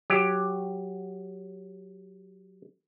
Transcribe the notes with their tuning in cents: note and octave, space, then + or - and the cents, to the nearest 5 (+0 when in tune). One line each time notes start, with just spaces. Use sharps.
F#3 +0 G4 +5